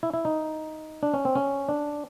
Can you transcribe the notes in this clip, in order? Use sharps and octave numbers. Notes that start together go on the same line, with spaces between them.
E4
E4
D#4
D4
C#4
C4
C#4
D4